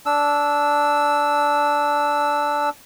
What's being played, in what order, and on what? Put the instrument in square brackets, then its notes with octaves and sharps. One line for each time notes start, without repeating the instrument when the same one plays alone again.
[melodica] D4 E6